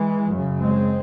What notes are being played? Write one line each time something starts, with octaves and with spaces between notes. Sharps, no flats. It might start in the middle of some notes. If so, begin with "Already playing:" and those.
Already playing: E3 G#3
F#2 C#3
G#3 C4